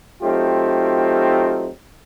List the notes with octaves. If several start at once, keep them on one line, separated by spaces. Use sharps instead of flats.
F#3 A3 C4 D#4 F4 G4